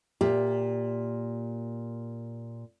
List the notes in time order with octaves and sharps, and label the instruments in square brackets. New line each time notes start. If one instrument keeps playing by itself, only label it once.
[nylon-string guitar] A#2 G4 E5